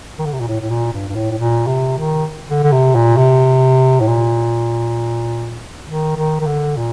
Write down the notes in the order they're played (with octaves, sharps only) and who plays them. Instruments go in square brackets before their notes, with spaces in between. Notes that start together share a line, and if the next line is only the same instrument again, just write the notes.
[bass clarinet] D#3
D3
C3
A#2
A2
A2
A#2
G2
G2
A2
A2
A#2
C3
D#3
D3
D3
C3
A#2
C3
A2
A#2
D#3
D#3
D#3
D3
A#2